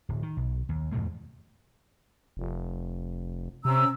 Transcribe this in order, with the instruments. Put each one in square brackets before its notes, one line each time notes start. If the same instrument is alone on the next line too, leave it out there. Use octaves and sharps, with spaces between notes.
[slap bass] D1
D#3
B1
D#2
E2 G#2 B2 A3
[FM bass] F1
[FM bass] C3 [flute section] C#4 A#5 E6